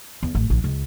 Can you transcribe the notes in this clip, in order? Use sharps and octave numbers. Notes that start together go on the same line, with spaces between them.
E2
A1
A#1
C#2